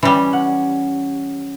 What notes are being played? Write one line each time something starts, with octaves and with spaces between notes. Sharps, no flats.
E3 G3 C#4
F#5